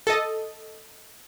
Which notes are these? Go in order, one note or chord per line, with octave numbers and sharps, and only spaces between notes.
A4 D#5